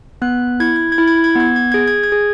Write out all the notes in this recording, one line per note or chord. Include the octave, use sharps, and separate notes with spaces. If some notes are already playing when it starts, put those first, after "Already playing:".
B3 F#6
E4 G#6
G#6
G#6
E4
G#6
G#6
B3 G#6
G#6
G#4 G#6
G#6
G#6
G#4